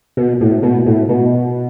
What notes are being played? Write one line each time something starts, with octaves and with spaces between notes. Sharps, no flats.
B2
A2
B2
A2
B2